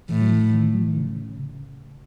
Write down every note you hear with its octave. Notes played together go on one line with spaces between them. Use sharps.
A2 E3
F#3
E3
D#3
F#3
E3
D#3
C#3